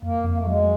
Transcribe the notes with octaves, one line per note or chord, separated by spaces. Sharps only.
F2 A#3
F2 A#3
A3
F#3 G#3